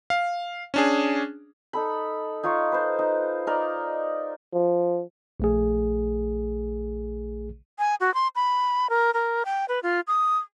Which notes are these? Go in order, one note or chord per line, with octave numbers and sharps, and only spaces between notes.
F5
C#4 D4 G#4
D#4 A4 B5
D#4 F4 C#5 F5
B4 C5
D#4
D#4 A#4 D5 D#5
F3
A#1 A3 G#4
G#5
F#4
C6
B5
A#4
A#4
G5
B4
F4
D#6